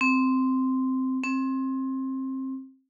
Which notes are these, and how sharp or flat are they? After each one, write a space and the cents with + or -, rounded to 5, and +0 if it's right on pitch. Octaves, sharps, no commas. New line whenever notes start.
C4 -5
C4 +20